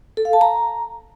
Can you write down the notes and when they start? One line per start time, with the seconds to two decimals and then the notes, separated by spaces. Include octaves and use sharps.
0.17 A4
0.25 F5
0.33 A5
0.41 A#5